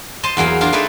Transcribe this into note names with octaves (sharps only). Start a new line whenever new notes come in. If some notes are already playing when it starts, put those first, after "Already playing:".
C5 D#5 A5 C6
E2 F#3 A#3 G#4 F5
D4 F4 A#4 F5 A#5
A3 D#4 G#4 B4 D5 E5